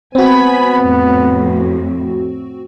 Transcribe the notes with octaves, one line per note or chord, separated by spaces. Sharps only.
B3 C4 F#4 G#5 B5
F2 A2